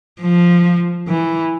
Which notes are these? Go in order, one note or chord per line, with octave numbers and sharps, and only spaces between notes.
F3
E3